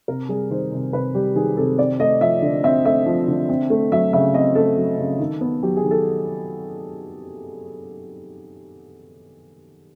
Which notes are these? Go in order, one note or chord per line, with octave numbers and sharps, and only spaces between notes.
C3 A#4
G3 G#4
D#3 C5
C3
C3 B4
G3 G4
D#3 G#4
C3 A4
C4 D5
A3 D#5
F3 E5
D3
C4 E5
A3 E5
F3
D3
C4
A3
F#3 E5
C#3 E5
C4 D#5
A3 A4
F#3
C#3
D#3
B3
F#3 G4
G#4
D#3
A4